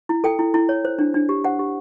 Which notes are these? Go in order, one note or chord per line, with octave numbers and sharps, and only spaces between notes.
E4
A4 G5
E4
E4
C#5
C5
D4
D4
G4
C5 F#5
G4